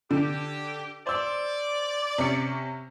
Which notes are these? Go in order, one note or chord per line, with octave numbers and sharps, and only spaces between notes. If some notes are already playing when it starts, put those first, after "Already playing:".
D3 G4
C5 D5 E6
C3 C#4 C#7